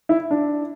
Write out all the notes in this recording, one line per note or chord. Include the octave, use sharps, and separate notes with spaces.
E4
D4